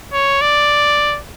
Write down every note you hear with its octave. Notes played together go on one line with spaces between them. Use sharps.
C#5
D5